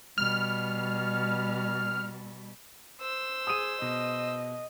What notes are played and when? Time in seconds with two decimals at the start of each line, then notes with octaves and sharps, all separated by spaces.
0.18 B2 G3 F6
3.00 C5 E6
3.47 G#4 D#6 D#7
3.82 B2 D#5